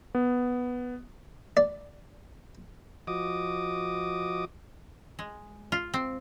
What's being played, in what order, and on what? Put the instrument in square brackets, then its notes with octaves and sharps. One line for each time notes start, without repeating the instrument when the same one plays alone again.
[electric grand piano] B3
[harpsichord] D5
[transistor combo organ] F3 F#4 D#5 D6 D#6
[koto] G#3
F4
C4